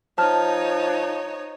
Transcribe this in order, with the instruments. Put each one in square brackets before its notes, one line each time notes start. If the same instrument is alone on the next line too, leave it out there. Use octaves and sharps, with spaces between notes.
[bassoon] F3 [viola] D#4 C#5 [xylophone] A5 F6